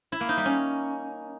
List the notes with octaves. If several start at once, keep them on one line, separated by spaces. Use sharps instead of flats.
E4
A#3
D#4
G3
C#4